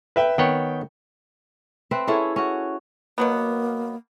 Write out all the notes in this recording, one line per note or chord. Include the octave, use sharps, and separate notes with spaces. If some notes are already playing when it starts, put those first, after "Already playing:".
B4 E5 G5
D#3 B3 C#5 G5
C4 B4 E5
C#4 E4 G#4 A4
C#4 F#4
B2 F#3 A#3 B3